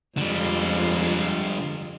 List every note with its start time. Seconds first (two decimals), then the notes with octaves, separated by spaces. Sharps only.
0.17 F2 D3 G3 G#3 F4